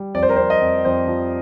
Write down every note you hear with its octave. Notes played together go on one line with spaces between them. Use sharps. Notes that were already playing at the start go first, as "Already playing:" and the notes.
Already playing: G3
F2 D5
C5
A#4
F2 C5
D#5
F2
F2 C5
F3